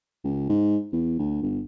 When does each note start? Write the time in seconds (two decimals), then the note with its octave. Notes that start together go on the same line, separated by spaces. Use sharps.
0.24 C#2
0.49 G#2
0.93 E2
1.19 D2
1.42 G1